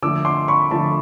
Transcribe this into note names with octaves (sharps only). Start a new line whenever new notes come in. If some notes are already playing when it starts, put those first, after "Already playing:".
D3 F3 A3 D6 E6
C6 D6
B5 C#6
D3 F3 A3 A5 B5